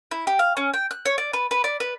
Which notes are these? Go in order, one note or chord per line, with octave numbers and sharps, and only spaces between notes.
E4
G4
F5
C#4
G5
F#6
C#5
D5
B4
B4
D5
B4